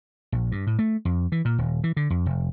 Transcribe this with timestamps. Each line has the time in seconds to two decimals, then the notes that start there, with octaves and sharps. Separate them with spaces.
0.32 A#1
0.52 G2
0.67 A2
0.79 A3
1.05 F2
1.32 E3
1.45 A#2
1.58 D#1
1.84 E3
1.97 D3
2.10 F2
2.26 F1